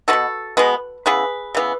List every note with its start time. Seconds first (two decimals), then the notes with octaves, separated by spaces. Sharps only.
0.08 G#3 B3 F#4 A4
0.13 B2
0.57 B2 G#3 B3
1.06 C#3 E3 B3 G#4 B4
1.55 C#3 E3 B3